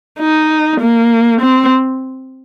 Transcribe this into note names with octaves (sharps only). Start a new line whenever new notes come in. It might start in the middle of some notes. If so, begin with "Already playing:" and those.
D#4
A#3
C4